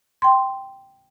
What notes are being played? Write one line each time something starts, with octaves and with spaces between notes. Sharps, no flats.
G5 C6